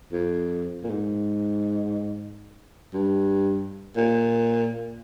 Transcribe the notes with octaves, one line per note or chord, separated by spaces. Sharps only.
F2
A#2
G#2
G2
A#2